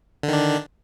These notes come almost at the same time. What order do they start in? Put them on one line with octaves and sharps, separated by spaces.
D3 D#3 D4